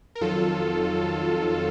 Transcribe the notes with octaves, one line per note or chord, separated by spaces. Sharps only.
A#4
F2 D#3 F#3 F4 A4